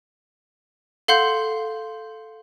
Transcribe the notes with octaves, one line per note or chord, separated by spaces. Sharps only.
A4 F5 F#5 C6 G6